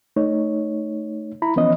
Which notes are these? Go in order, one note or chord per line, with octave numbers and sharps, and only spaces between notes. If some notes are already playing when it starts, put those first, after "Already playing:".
A3 D#4 C#5
E4 A#5 B5
E3 F3 B3 C#4 D#5